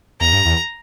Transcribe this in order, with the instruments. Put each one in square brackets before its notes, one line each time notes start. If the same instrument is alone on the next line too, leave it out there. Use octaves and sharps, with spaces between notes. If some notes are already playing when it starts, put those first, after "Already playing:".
[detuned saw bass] E2 [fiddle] A#5
[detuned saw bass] G2
E2